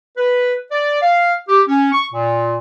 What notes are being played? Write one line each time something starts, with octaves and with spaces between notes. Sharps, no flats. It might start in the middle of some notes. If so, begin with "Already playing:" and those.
B4
D5
F5
G4
C#4
C#6
A#2